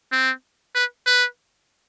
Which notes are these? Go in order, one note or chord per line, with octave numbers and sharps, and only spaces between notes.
C4
B4
B4